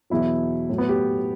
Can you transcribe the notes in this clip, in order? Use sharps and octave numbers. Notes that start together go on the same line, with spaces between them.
E2 B2 F#3 E4
A2 F#3
B3
G4